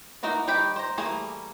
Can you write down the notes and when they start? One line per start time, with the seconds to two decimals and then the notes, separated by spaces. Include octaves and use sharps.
0.23 A#3 D#4 E4 F#4 D5
0.47 D#3 G3 G4 G5 B5
0.76 C5 A#5
0.98 E3 G3 A3 A#3 G#4